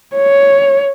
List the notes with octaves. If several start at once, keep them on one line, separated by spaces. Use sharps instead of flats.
C#5